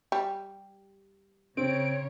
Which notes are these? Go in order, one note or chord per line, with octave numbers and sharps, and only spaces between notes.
G3
C#3 C4 C#5 D7